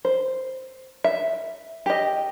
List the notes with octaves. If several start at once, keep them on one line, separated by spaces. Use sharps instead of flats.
C5
E5
G4 D#5